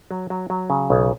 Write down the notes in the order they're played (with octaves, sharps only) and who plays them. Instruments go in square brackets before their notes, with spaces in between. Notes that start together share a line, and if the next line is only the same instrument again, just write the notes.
[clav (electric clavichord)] F#3
F#3
F#3
C#3
B1